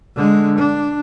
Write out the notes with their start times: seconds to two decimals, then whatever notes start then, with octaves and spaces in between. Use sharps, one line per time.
0.15 D3 G#3
0.58 D4